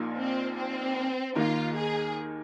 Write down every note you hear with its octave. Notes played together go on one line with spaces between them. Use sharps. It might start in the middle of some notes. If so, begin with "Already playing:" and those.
Already playing: A#1 A#2 A#3 D#4
C4
C4
D#2 D#3 A#3 D#4 F4 A#4
G#4